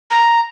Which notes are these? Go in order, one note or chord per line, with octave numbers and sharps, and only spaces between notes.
A#5